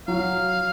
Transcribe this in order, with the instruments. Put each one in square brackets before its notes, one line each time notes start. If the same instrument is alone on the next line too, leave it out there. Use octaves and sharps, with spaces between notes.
[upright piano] F#3 [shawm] F5